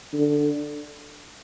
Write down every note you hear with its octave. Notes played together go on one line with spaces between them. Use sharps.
D3